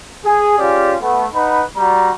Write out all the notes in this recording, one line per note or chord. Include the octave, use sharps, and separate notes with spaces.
G#4
C#4 F4 G4 G#4 D5
A3 B3
D#4 B4 F#5 B5
G3 F#4 D5 A#5